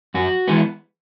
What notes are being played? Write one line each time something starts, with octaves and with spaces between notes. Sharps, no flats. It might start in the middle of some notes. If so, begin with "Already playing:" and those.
F#2 F#4
E3 G#3 B3